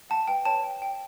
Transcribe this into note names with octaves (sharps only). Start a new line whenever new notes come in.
F#5 A5
B4 G5
C#5 A5
G5
G5